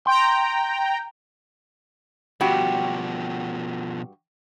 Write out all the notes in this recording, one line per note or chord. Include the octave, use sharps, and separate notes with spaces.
G5 A#5 C6
G2 B2 F3 F#4 G4